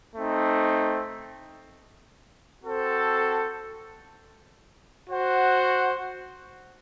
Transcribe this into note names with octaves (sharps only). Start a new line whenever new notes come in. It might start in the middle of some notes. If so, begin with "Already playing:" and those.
A3 C4 D#4
C4 F#4 A4 C5
F#4 C5 F#5